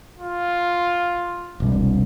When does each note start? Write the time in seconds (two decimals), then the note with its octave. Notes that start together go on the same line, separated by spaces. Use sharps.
0.18 F4
1.60 E1 C2